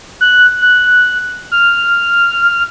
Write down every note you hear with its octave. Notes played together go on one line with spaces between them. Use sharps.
F#6
F#6
F6